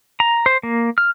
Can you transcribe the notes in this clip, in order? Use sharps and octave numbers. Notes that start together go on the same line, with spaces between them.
A#5
C5
A#3
F6